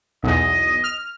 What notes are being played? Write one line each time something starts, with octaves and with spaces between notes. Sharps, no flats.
B1 E2 D#5
F6